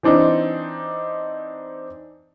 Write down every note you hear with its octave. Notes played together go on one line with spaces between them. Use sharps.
E3 C4 D4 D#4